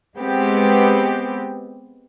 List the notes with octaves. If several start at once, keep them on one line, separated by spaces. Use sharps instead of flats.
G#3 B3 C4 G4